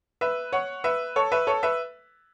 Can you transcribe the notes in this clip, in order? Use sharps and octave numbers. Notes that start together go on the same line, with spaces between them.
B4 E5
C#5 F#5
B4 E5
A4 C#5
B4 E5
A4 C#5
B4 E5